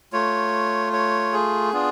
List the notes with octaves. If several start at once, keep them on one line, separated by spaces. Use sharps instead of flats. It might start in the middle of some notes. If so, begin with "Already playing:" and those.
A3 F4 C#5
C#5
G#4
B3 D4 F4